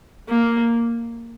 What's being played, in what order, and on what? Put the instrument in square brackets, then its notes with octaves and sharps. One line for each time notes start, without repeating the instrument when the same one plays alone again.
[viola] A#3